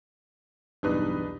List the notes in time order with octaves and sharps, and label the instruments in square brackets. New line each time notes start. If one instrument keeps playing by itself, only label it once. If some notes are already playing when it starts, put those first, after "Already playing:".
[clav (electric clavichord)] B1 E2 G2 [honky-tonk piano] D4 D#4 B4